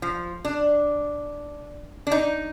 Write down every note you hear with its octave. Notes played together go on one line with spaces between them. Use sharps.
F3
D4
D4
D#4